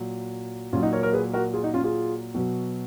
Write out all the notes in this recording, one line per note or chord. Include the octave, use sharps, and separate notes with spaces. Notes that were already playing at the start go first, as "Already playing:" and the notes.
Already playing: A#2 F#3
A#2 F#3 C#4 F4
D#4 F#4
A#4 C#5
A#4 C#5
G#4 B4
F#4 A#4
F4 G#4
D#4 F#4
C#4 F4
F4 G#4
B2 F#3